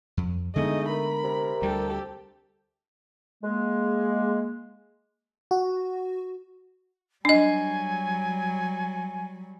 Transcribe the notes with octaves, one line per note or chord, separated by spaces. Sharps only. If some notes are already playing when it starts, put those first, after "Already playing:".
F2
D3 G#3 A3 B3 D#4 G#4 D#5
A#4 B5
C3
D2 G3 G4 A4
G#3 A#3
F#4
F#3 G3 D4 D#5 G#5